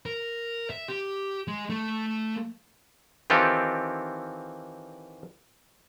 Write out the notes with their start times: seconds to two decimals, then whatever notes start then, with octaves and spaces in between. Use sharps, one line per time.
0.06 A#4
0.70 E5
0.88 G4
1.48 G#3
1.70 A3
3.30 D#3 E3 C4 F4 G4 A4